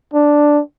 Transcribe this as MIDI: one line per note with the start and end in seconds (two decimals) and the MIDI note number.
0.14 0.61 62